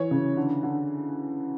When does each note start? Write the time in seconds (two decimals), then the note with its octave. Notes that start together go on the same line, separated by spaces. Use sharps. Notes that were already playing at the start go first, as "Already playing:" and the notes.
Already playing: E3 C#5
0.11 C#3
0.37 D3
0.63 D3